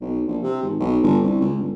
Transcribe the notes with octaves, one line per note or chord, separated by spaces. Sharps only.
B1
A#1
C3
G#1
B1
G1
C2
C#2
G1